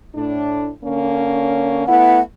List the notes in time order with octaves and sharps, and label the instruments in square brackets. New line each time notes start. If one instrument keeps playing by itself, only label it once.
[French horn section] A2 D4
D3 A#3 C#4
[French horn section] A3 B3 E4 [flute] F#5